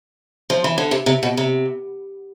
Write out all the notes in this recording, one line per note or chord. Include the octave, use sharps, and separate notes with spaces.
F3
E3
D3
C3
C3
B2
C3